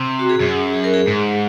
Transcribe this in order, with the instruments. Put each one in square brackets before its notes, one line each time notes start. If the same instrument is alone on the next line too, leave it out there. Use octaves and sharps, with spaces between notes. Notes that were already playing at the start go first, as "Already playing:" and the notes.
Already playing: [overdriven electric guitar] C3
[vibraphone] F#4
G#4
[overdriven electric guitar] F#2 [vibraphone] G#4
[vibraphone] G#4
A#4
G#4
[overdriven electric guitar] G#2